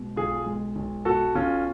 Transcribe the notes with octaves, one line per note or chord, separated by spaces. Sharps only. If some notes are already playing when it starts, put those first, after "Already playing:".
Already playing: B2 G#3
B1 F4 G#4
G#3
B1
B2 F#4 A4
B1 C#4 F4